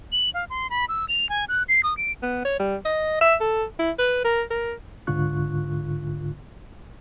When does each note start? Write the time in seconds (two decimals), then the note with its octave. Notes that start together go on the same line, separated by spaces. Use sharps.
0.12 F#7
0.34 F5
0.50 C6
0.70 B5
0.89 E6
1.08 F7
1.29 G#5
1.49 F#6
1.69 C7
1.83 D#6
1.97 D7
2.22 B3
2.45 C#5
2.60 G3
2.85 D#5
3.21 E5
3.40 A4
3.79 E4
3.98 B4
4.24 A#4
4.50 A#4
5.07 C#2 G#2 D3 F4 C#6 F#6